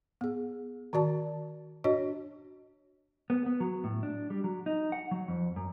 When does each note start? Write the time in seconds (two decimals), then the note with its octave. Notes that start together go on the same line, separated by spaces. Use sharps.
0.21 B3 G#4
0.93 D#3 F#4 D5 A5
1.84 D4 F#4 C#5 D#5
3.30 B3
3.46 B3
3.60 F#3
3.84 A2
4.03 D4
4.30 G3
4.44 F#3
4.66 D#4
4.92 F#5
5.11 F#3
5.28 F2
5.56 F#2